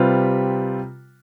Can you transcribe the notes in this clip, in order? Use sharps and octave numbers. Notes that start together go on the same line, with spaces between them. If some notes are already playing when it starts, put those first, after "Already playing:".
Already playing: C3 G3 C4 F4 B4